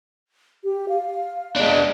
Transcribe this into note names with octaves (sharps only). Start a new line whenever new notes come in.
G4
F5
G#3 D4